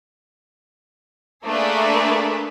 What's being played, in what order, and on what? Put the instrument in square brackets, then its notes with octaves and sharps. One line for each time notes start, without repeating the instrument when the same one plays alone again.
[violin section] A3 A#3 D4 G#4 A4 B4